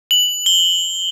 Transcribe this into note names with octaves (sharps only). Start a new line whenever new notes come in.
F#7
G7